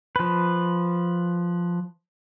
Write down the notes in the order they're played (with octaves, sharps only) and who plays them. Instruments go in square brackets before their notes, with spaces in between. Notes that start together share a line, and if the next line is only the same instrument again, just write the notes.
[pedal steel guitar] F3 B4